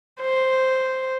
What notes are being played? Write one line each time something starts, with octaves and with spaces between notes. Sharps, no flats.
C5